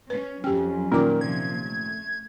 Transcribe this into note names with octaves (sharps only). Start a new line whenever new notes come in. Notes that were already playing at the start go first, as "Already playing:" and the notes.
C#4 B4
F2 F#3 C#4 G4 G5
A#2 D#3 C#4 A#4 D6
C3 F3 A#3 G#6
A3